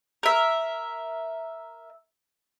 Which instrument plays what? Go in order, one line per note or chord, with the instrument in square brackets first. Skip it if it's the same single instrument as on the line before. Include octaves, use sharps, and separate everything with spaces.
[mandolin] A#4 E5